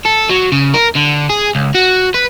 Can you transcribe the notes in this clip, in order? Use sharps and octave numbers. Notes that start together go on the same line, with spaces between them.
A4
F#3
C#3
A#4
D3
G#4
C#2
F#4
B4